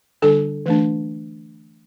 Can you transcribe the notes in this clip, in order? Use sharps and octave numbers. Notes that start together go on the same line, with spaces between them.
D3 G3 D4 A4
E3 A3 D4